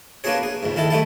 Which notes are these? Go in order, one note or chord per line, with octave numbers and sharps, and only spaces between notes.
A#3 B3 D4 F#4 G#4 C#5
G#4
C#2 G#2
D#3 E4 A4
G3 A3 D#4 E4 A5